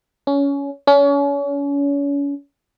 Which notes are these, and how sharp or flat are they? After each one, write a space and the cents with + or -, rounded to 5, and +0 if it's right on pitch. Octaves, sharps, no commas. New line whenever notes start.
C#4 +20
C#4 +35